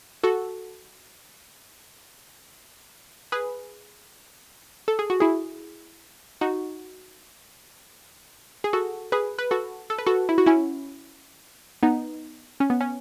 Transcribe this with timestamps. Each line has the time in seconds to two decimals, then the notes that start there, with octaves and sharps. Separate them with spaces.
0.23 F#4 A4
3.32 G#4 B4
4.88 A4
4.99 G#4
5.10 F#4
5.20 E4 G#4
6.41 D#4 F#4
8.64 G#4
8.73 F#4 A4
9.12 G#4 B4
9.38 B4
9.51 F#4 A4
9.90 A4
9.98 B4
10.06 F#4 A4
10.29 E4
10.38 F#4
10.46 C#4 E4
11.83 B3 D#4
12.60 C#4
12.70 B3
12.81 C#4